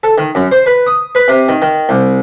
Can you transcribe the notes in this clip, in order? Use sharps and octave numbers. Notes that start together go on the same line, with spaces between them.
A4
D#3
F#2
C5
B4
D#6
B4
C3
D#3
D#3
C2